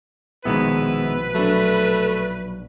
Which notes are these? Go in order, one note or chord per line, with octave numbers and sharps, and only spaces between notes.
A#1 B2 D#3 F3 G#3 B3 E4 B4
F#3 A3 D4